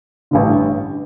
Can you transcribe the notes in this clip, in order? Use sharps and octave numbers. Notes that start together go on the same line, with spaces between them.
A1 G2 D3